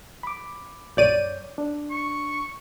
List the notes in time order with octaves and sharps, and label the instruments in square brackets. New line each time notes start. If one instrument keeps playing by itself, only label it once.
[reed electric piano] B5 D6
[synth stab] A#1 D5 D#7 [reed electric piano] F#2 C#5 G6
[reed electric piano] D4
[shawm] C#6